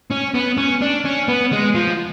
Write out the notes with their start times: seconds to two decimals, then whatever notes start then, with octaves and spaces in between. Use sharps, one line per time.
0.11 C#4
0.35 B3
0.57 C#4
0.81 D4
1.05 C#4
1.28 B3
1.52 G#3
1.74 F3